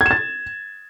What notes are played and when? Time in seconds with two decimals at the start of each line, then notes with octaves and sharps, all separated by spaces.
0.01 G#6
0.06 E7
0.11 A6